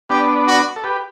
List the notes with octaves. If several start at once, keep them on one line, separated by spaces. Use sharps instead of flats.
B3 D4 G4
F#4
A4
G4 B4